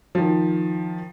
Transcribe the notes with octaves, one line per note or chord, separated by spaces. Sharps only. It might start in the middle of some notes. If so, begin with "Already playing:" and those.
D#3 F3